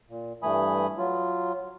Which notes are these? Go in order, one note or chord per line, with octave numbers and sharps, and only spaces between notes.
A#2
G2 E3 A3 G#5 B5 D#6
F#3 F4